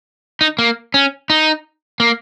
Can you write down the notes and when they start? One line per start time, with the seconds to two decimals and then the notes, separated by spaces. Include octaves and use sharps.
0.41 D#4
0.59 A#3
0.94 C#4
1.30 D#4
2.00 A#3